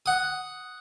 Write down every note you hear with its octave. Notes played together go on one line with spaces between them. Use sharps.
F#5 D#6